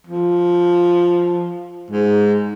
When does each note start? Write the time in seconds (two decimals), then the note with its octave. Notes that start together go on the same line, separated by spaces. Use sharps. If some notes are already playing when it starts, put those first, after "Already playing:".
0.07 F3
1.91 G#2